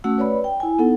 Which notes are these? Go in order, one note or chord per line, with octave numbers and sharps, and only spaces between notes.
A3 C#4 F#4 F#5 E6
B4 C#5 D5 B5
G5
E4 G#5
B3 D#4 A4 F#5